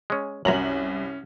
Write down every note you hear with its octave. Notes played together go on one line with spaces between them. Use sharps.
G#3 C#4
C2 F#2 C#4 A#5 F#7